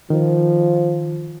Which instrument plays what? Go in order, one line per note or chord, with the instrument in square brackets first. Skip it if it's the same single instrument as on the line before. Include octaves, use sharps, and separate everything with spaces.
[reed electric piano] D#3 [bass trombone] F3